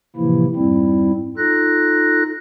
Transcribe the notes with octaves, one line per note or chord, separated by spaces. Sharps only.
A2 C3 E3 F3 A#3 E4
F2 G#2 G3 C4 E4
D#4 F4 A4 F#6 A#6